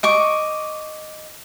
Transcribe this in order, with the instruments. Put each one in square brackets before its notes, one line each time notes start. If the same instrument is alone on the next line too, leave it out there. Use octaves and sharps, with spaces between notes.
[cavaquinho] D#5 C#6 D6